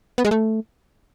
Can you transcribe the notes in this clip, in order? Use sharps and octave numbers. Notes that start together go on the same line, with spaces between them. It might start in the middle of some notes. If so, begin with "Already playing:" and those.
B3
G#3
A3